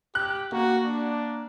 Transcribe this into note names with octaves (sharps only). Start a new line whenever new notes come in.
G4 F#6
A#3 F#4
D4